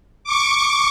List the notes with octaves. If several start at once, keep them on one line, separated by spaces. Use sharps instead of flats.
C#6 D6